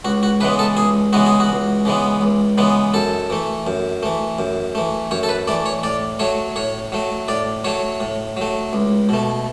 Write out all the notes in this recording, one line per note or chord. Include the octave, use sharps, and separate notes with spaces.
C#2 F#4
F#4
C#3 E3 G#3 B3 B4
A4
C#2 G#4
C#3 E3 G#3 B3 F#4
G#4
F#4
C#2
C#3 E3 G#3 B3
C#2
C#3 E3 G#3 B3
F#2 A4
E3 A3
F#2
E3 A3
F#2
E3 A3
F#2 C#5
A4
B4
E3 A3 D5
C#5
A2 D5
F#3 A3 C#5
A2 C#5
F#3 A3
A2 D5
F#3 A3 C#5
A2
F#3 A3
C#2
B2 A3